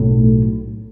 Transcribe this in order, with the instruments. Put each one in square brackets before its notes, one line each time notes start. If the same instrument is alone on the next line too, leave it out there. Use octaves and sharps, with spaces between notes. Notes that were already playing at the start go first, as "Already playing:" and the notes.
Already playing: [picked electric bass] B1 A2